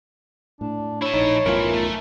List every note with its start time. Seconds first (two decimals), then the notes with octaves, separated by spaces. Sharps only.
0.61 A2 D4
1.02 E4 C#5 A5
1.14 A#1 D#4
1.46 B1 F#2 A2 E3 F4 A#4
1.74 A3